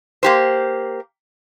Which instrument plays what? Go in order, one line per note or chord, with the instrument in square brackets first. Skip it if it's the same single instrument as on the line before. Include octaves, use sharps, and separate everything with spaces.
[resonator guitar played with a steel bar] A#3 G4 C5